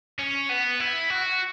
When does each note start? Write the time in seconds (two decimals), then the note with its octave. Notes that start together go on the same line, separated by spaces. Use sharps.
0.19 C#4
0.49 B3
0.80 E4
1.10 F#4